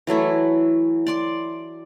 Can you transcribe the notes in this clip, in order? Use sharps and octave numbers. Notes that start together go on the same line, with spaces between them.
E3 F#3 A3 E4
D5 C6 D6